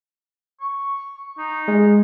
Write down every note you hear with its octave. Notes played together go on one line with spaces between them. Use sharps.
C#6
D#4
G#3